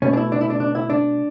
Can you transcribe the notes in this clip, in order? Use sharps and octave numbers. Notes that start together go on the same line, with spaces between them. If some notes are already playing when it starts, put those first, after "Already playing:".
B2 A3 C#4
D4
E4
D4
E4
D4
D4
E4
D4